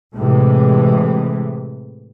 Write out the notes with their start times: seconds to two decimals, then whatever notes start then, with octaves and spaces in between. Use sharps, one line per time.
0.15 A2 C3 E3 G#3